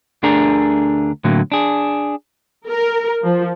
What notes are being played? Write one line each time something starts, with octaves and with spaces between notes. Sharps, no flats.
D2 D3 D4 G#4 A#4
A2 D3 F#3 A#3
D4 G#4
A#4
F3